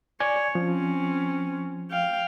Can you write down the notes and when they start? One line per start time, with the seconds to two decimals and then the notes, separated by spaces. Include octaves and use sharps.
0.20 C#5 D5 G#5 G#6
0.55 F3 C4 C#4
1.91 F5 G5